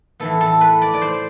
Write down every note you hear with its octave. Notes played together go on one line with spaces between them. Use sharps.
A2 E3 B3 A4
A4
B4
D5
D5
C5